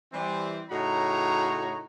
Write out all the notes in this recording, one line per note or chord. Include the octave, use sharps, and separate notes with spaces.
E3 G3 C4
A2 C#3 D#4 F#4 C#5 A#5